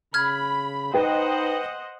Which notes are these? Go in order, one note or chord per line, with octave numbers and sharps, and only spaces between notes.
C#3 B5 F6 G#6
D#4 B4 C5 D#5 F#5 G5